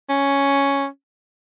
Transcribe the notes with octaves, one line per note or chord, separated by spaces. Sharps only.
C#4